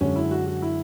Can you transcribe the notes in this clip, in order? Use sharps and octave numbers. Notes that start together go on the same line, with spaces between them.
F#2 D3 G#3 C#4
E4
F#4
F#4
E4